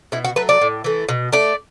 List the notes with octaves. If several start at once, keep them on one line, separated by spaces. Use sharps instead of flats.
B2 E4
F#4
F#3 A3 B4
D5
A2
E3 A3
B2
A3 D5